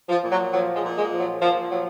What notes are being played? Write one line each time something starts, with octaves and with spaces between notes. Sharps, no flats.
F3
A#2
F#3
F3 F#3
G#3
A#2
G#3
F3
F#3
A#2 F3
F3 F#3